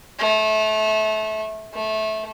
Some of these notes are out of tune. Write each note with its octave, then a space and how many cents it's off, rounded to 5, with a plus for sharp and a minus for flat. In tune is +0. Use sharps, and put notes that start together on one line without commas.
A3 -25
A3 -20